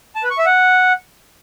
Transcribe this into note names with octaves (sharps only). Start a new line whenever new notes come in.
A5
B4
C#6
E5
F#5